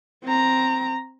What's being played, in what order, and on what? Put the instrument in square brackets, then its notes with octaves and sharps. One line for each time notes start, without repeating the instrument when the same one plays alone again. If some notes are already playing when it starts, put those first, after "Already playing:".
[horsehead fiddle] C4 A#5